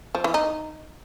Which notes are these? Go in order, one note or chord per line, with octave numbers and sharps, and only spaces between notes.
F3
E3
D#4